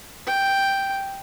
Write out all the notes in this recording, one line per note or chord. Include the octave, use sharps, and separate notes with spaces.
G5